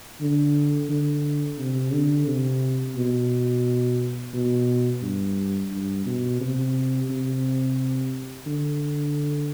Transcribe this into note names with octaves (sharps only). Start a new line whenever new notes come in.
D3
D3
C3
D3
C3
B2
B2
G2
G2
B2
C3
C3
D3